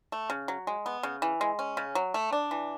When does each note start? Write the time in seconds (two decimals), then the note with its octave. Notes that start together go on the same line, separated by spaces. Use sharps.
0.12 A3
0.30 C#3
0.48 F#3
0.67 G#3
0.86 B3
1.03 C#3
1.22 E3
1.41 G#3
1.59 C#4
1.77 C#3
1.95 F#3
2.14 A3
2.33 D4
2.51 E3